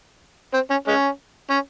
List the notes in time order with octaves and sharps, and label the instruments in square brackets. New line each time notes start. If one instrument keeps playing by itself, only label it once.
[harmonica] C4
C#4
G#3 C#4
C#4